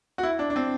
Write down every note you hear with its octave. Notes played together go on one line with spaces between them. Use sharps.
F#4
E4
D4
D4
C4